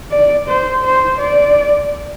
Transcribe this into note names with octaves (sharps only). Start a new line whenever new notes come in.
D5
C5
C5
D5